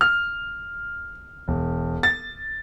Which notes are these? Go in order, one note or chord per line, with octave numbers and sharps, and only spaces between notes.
F6
E1
A6